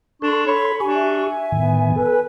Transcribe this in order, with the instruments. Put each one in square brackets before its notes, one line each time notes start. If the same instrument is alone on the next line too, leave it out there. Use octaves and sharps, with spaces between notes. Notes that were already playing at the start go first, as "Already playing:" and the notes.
[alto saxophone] D4 [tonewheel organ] A4 C6 [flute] C#6
[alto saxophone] C#5 [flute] B5
[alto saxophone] D4 [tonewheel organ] G4 C#6 [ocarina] G#5
[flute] E5
[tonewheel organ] A2 D#3 [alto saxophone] B3
[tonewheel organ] A4 [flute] B4